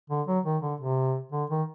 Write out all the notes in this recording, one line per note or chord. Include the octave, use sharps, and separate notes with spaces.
D3
F#3
D#3
D3
C3
D3
D#3